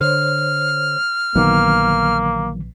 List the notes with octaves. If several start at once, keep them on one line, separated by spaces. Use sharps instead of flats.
D3 C5 C#5 F6
A#1 D3 D#3 F#3 A#3 B3